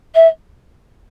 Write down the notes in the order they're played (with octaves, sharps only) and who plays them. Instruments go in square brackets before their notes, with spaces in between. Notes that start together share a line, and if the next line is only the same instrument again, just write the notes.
[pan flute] E5